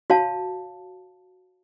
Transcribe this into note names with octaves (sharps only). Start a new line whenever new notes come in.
F#4 C#5 F5 A5